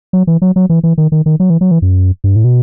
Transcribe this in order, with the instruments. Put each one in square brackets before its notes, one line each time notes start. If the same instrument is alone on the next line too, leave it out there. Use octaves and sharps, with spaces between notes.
[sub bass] F#3
E3
F#3
F#3
E3
E3
D#3
D#3
D#3
F#3
E3
F#3
E3
F#2
G2
A2
B2